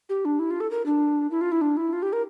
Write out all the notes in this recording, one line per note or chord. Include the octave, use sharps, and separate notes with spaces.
G4
D4
E4
F4
A4
A#4
D4
E4
F4
E4
D4
E4
F4
G4
A#4